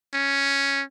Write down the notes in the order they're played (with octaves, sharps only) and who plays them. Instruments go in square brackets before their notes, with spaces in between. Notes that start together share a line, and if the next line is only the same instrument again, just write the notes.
[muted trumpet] C#4